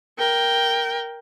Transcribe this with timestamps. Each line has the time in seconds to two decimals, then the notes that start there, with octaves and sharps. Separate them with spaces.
0.19 A#4 G5